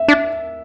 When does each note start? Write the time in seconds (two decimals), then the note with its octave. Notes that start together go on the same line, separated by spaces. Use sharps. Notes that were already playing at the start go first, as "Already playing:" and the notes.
Already playing: E5
0.08 D4